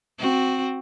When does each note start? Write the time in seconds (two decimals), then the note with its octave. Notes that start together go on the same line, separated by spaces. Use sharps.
0.19 C4 F#4